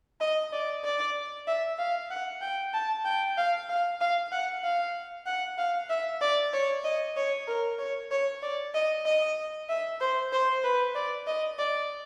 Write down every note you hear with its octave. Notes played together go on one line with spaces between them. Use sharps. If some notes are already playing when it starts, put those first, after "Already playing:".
D#5
D5
D5
E5
F5
F#5
G5
A5
G5
F5
F5
F5
F#5
F5
F#5
F5
E5
D5
C#5
D#5
C#5
A#4
C#5
C#5
D5
D#5
D#5
E5
C5
C5
B4
D5
D#5
D5